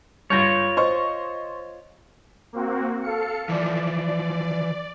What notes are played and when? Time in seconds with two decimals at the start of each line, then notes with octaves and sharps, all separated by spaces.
0.30 G2 F4 C#5 G6 A#6
0.77 C5 D#5 C#6
2.53 A#3 C4 F#4
3.01 A4 F5 C#7
3.49 E3 F3 D5